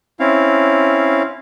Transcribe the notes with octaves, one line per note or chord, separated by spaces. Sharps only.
C4 C#4 E4 F5